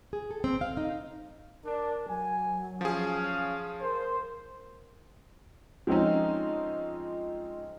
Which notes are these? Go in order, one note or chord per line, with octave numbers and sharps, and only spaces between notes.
G#4
A4
C4
F5
D#4
D4 A#4
F#3 G#5
F3 C#4 G#4 F5
A#4 C5
F3 G#3 C4 C#4 D#4